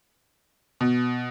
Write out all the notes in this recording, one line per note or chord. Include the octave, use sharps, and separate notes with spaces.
B2